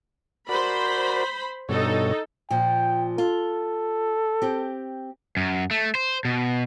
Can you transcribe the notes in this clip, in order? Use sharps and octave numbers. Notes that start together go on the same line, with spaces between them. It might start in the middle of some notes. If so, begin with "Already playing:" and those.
F#4 A#4 C5 D5 B5
G2 B2 D#4 A4 C#5
A#2 F3 G5
F4 A4
C4 G4
F#2
A3
C5
B2